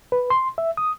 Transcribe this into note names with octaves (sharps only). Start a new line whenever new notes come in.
B4
C6
E5
D#6